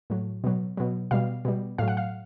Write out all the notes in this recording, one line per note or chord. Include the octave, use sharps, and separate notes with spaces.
A2 F#3
B2 F#3
B2 F#3
B2 G3 F5
B2 G3
A2 F#3 F5
F#5
F5